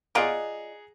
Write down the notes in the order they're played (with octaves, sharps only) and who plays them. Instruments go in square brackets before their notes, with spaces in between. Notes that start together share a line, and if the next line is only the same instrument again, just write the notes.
[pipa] F4 D5 D#5 [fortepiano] G#4 F#5 A#5